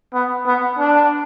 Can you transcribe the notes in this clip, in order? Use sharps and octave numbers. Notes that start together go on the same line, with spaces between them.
B3
B3
D4